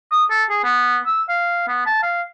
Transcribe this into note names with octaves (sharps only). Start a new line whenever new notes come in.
D#6
A4
G#4
B3
E6
F5
B3
A5
F5